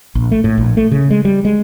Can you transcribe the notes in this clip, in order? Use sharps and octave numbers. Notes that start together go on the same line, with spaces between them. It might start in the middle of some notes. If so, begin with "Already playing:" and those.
A#1
A3
A2
A#1
A3
C#3
G#3
G3
G#3